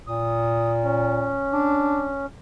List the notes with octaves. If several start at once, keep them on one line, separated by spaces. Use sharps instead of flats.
A#2 D#6
C#4
D4